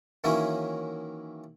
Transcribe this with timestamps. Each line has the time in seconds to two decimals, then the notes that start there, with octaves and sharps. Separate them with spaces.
0.24 D#3 E3 F#3 A#3 C#4 E4